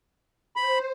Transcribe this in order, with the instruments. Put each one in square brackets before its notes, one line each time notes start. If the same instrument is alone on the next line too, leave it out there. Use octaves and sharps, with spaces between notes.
[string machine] C5 [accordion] B5